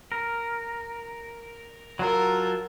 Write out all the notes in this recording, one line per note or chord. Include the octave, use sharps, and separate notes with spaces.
A#4
F#3 F4 A4 A#4